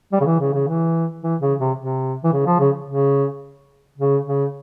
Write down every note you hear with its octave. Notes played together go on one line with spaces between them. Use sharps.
G3
C#3
E3
C#3
C#3
E3
E3
C#3
C3
C3
E3
C#3
F3
C#3
C#3
C#3
C#3